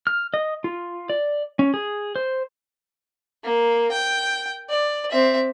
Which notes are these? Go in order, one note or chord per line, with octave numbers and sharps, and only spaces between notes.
F6
D#5
F4
D5
C#4
G#4
C5
A#3
G5
D5
C4 E5